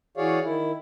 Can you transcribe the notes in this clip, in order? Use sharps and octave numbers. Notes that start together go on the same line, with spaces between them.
E3 F#4 G#4 C#5 D5 F5
D#3 E4